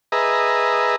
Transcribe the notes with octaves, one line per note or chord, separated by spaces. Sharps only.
G#4 B4 D#5 E5 A#5